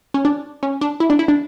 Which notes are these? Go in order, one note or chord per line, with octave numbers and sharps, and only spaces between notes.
C#4
D4
C#4
D4
E4
D4
E4
D4